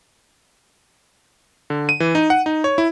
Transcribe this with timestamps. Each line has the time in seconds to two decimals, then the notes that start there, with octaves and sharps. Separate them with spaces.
1.70 D3
1.89 D#7
2.00 E3
2.15 D#4
2.30 F#5
2.46 D#4
2.64 C#5
2.78 E4